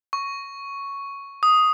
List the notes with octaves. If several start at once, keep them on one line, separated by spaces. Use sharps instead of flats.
C#6
D#6